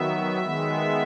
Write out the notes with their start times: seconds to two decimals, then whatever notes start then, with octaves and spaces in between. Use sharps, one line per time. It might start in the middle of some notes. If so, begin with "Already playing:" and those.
Already playing: D#3 F#3 B3 E5
0.42 D#3 G#3 B3